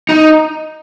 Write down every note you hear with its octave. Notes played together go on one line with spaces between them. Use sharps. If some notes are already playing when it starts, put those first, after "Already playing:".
D#4